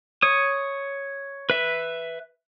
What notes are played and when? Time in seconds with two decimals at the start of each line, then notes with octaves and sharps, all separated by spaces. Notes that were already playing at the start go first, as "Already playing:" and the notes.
0.22 C#5 D#6
1.50 B4 E5